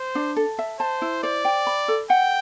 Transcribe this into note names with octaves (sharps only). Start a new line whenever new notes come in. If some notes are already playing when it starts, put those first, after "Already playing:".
Already playing: C5
D4
A4
E5
C5 A5
E4
C5 D5
G5
B5
A4
F#5 G5